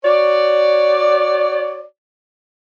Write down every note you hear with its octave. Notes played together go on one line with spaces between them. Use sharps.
F#4 C#5 D5